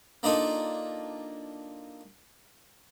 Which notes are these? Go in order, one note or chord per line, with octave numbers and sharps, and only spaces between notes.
A#3 D4 D#4 F4 A4